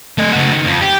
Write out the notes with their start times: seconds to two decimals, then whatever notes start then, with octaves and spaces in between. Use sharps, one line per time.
0.18 A3 D#5
0.32 C#3 F#4
0.53 D#3
0.65 F2
0.82 G4